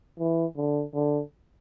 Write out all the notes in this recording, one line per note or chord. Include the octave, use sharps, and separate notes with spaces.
E3
D3
D3